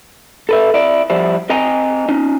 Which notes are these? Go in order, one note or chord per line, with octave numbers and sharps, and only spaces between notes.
A4 B4 E5
E4 D5
F3 G3 E4 C5
C4 D#5 G5 G#5 A#5
C#4 D#4